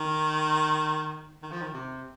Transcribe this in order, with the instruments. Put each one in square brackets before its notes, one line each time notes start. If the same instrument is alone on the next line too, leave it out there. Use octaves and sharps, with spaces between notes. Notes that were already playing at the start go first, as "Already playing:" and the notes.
Already playing: [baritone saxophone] D#3
D#3
F3
D#3
C3